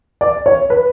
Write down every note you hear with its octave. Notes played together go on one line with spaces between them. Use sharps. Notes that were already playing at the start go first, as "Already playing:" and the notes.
D5
C#5
B4